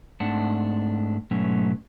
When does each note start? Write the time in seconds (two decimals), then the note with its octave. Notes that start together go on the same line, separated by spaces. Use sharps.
0.20 G#2 A3 C4 D4 F#5 A5
1.31 G#2 B2 F#3 A3 C#4